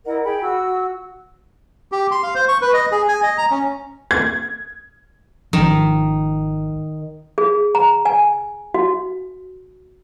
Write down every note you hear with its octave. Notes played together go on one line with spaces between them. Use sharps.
E4 A#4 D#5 F#5
G#4 G5 B5
F#4 E6
G4
C6
F5
C5
C#6
B4
D#5
G#4
G#5
D#5
A#5
C#4
G#6
G#1 D#3 F3
G#4
A#5
G#5
F#4